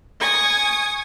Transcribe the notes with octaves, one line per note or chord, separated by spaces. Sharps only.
G#5 C#6 D#6